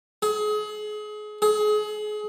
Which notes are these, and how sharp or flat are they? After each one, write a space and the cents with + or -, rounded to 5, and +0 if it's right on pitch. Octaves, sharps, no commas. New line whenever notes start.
G#4 +30
G#4 +30